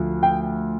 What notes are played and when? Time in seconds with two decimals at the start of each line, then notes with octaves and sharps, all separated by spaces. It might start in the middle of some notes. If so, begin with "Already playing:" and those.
Already playing: D2 F3
0.23 G5